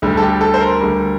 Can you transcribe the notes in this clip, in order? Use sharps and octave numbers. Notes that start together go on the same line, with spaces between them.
D2 D3 G3
A4
G4
A4
C5
A#4
D2 D3 G3